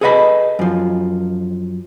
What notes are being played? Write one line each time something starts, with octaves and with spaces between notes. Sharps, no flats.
G#4 A4 B4 D#5 F5 B5
F#2 F3